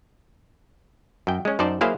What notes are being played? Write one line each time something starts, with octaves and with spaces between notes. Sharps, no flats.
F#2 G5
G#3 C#4
F#2 D#4 C5 D5 A5
F#3 A#3 E4 G#4 C5 F5